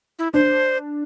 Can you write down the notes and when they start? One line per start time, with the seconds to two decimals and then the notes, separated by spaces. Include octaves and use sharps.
0.19 E4
0.34 D4 C5